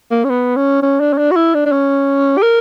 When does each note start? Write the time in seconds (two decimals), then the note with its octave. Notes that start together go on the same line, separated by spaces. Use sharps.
0.11 A#3
0.24 C#4
0.30 B3
0.56 C#4
0.83 C#4
1.00 D4
1.13 C#4
1.18 D4
1.31 F#4
1.36 E4
1.54 D4
1.66 D4
1.72 C#4
2.38 G4
2.43 A#4